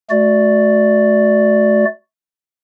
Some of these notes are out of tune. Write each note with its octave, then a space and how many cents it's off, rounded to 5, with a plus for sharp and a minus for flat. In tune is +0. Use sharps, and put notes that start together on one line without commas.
A3 -30 F#4 +0 D5 +0